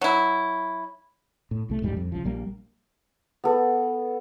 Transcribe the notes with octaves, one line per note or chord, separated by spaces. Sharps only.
F#3 E4
A2
C2 A3
E1 A#1 G#2 G3
F2
C2 C#3 F3
A#1 G3 A#3
B3 A4